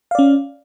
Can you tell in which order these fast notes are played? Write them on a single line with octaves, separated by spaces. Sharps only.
F5 D5 C#4